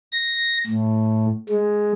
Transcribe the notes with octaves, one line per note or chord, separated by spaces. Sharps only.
A#6
A2
G#3